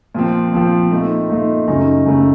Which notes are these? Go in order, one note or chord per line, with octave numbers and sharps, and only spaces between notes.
A#2 F3 C4
A#2 F3 C4
A#2 A3 D#4
A#2 A3 D#4
F#2 C#3 F#3 A3 D#4
F#2 C#3 F#3 A3 D#4